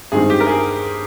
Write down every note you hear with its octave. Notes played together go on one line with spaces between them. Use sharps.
G2 D#3 G#3 C4 G#4
G4
A#4
G#4